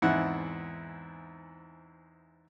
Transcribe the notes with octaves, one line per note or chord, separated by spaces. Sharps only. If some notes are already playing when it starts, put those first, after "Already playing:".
E2 G#2 C4 E4 F#5